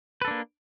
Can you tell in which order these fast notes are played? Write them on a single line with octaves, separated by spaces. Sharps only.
B4 A4 D4 A#3